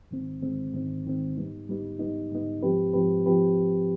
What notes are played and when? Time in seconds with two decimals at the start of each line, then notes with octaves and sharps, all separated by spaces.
0.11 G#2 D#3 G#3 C4
0.42 G#2 D#3 G#3 C4
0.74 G#2 D#3 G#3 C4
1.06 G#2 D#3 G#3 C4
1.37 G#2 G3 B3 D#4
1.69 G#2 G3 B3 D#4
1.99 G#2 G3 B3 D#4
2.32 G#2 G3 B3 D#4
2.63 G#2 F3 C4 G4 B4
2.94 G#2 F3 C4 G4 B4
3.26 F3 C4 G4 B4